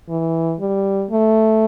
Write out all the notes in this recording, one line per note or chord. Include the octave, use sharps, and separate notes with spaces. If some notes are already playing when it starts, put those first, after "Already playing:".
E3
G3
A3